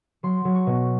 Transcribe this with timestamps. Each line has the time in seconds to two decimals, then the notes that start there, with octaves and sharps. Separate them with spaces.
0.23 F#3 C6
0.45 F#3
0.55 C#6
0.67 B2